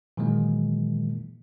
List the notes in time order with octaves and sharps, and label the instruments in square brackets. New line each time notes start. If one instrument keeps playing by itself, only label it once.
[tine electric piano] A#2 D#3 E3 F#3 G#3 A#3